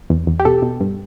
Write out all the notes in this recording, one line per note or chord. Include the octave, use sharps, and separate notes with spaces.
E2
E2
G4
B2 A4
B2
G2